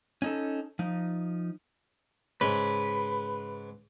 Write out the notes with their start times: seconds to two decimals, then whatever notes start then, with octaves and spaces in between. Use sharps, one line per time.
0.22 C#4 D#4 A4
0.79 F3 D#4
2.41 G#2 C#3 B4